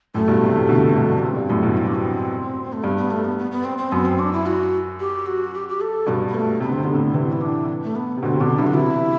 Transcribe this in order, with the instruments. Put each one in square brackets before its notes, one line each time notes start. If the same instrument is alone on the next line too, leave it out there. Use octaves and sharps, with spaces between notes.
[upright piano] F#2 A2 [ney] A3
[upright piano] G2 B2
A2 C3
C3 E3
B2 D3
G2 B2
[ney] D4
[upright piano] G2 [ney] C4
[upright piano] G2
[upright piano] F#2 A2 [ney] E4
[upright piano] G2 B2
[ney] C4
D4
C4
A3
[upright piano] G2 [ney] B3
[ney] B3
A3
B3
B3
B3
C4
C4
[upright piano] F#2 [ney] B3
[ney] C4
D4
E4
F#4
G4
F#4
G4
G4
A4
[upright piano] G2 B2 [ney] B3
[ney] B3
A3
[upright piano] C3 [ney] B3
[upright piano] D3
[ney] C4
[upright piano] C3
[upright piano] D3 [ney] B3
[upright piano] A2 C3
[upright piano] C3 E3 [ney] C4
[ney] E4
D4
A3
B3
[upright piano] C3
[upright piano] B2 D3 [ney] C4
[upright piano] C3
[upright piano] B2 D3 [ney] D4
[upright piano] D3 F#3 [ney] E4
[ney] F#4
[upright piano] C3 E3 [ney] E4